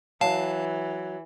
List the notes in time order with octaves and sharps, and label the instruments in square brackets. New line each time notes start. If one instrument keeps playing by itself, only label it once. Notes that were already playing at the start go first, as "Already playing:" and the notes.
[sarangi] E3 [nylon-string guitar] F#3 [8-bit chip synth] F5 A5